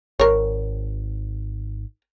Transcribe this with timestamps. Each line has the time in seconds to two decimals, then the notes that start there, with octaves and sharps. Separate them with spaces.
0.20 G#1 A#4 C#5